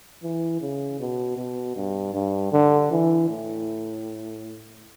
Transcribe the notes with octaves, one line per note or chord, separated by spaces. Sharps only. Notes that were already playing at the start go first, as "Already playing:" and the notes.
E3
C#3
B2
B2
G2
G2
D3
E3
A2